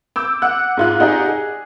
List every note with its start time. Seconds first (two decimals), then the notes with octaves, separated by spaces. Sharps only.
0.16 D6 E6 G6
0.42 F#5 F#6
0.77 G#2 F4 F#6
1.00 D#4 G4 G#4 D5 D#5 F#5
1.28 G#4